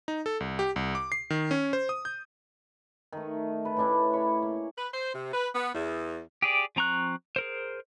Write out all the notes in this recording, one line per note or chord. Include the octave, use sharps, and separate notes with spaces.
D#4
A4
C2
G4
C2
D6
C7
D#3
C#4
C5
D#6
G6
D#3 A3
B4 A5
A2 C#4 D4 E4
C#5 B5
A#3
B4
C5
C3
B4
B3
E2
G4 G#4 D5
F3 C4 A#5 C#6 F#6
G#4 A#4 C5